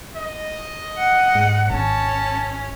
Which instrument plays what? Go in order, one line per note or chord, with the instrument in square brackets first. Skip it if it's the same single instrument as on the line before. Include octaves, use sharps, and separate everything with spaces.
[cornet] D#5
[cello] F#5
[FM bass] G#2
[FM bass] G#1 [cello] C#4 [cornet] A5